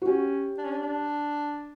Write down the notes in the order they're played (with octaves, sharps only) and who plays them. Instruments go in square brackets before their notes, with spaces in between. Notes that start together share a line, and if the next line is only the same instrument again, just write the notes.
[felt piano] F#4
[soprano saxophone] C#4 [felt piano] G4
[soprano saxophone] D4
C#4
D4
D4